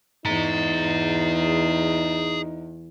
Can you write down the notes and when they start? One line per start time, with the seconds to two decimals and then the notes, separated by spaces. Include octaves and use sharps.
0.25 E2 D#4 G#4 A#5